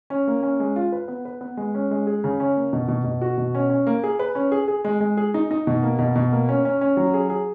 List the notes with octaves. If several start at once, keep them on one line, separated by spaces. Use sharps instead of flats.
C#4
A#3
C#4
G#3
F4
B4
B3
B4
B3
G#3
C#4
G#3
G#4
C#3
C#4
A#3
B2
B2
B2
F#4
B2
C#4
C#4
A#3
G#4
B4
C#4
G#4
G#4
G#3
G#3
G#4
D#4
D#4
B2
A#3
B2
B2
A#3
C#4
C#4
C#4
F#3
G#4
G#4